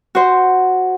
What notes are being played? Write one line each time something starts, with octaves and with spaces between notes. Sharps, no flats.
F#4 C5